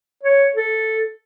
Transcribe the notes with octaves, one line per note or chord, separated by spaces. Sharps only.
C#5
A4